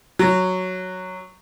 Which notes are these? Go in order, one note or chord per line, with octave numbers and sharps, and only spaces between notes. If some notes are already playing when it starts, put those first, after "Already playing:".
F#3